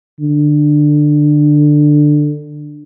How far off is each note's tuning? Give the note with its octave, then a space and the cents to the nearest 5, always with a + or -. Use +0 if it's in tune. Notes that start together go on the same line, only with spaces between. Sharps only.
D3 +15